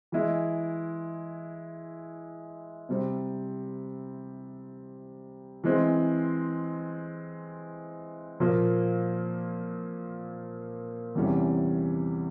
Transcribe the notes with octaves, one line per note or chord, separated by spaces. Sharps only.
E3 G#3 E4
C3 G3 C4
E3 G#3 C4
A#2 F3 A#3
E2 C3 E3 G3 C#4